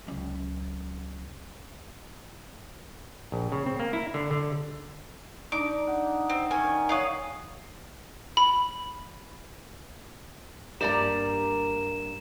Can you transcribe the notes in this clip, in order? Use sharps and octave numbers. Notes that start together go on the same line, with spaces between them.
C#2 F#3
A#1
C#3
C4
A#3
E4
D3
D3
D4 D#4 D6
F#5
C4
D#3 C#4 G#5
D#4 C#5 F5 F#5 D#6
B5
G2 A#3 D4 G4 A#4 D5 A#5 E7